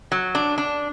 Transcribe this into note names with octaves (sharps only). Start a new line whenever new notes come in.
F#3
D4
D4